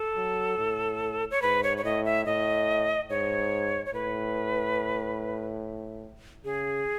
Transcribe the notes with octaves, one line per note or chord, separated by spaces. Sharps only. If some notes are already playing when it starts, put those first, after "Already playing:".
Already playing: A4
F#3
A2
C#5
G#2 B4
C#5
C#5
A2 D#5
E5
A2 D#5
G#2 C#5
C#5
A2 B4
C#3 G#4